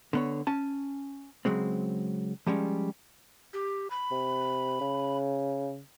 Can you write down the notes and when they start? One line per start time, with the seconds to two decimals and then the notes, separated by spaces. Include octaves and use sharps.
0.13 D3 B3 C#5
0.47 C#4 G#5 A5
1.45 C#3 F#3 G#3 C4
2.47 F3 G3 G#3 C#4
3.53 G4
3.91 B5
4.11 C3
4.81 C#3